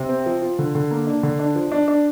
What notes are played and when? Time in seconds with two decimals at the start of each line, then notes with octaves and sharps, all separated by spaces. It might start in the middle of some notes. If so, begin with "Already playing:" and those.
Already playing: C3
0.09 C4
0.26 F3
0.42 F4
0.59 D3
0.75 D3
0.91 A#3
1.07 D4
1.23 D3
1.39 D4
1.55 F3
1.72 D4
1.88 D4